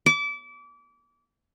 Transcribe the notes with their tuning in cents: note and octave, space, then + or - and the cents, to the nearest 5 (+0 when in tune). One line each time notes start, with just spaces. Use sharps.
D6 -30